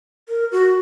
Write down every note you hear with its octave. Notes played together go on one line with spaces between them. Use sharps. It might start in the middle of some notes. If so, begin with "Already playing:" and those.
A#4
F#4